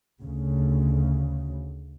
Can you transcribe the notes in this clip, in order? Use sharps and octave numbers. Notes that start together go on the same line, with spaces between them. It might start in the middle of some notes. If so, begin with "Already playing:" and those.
D2 C#3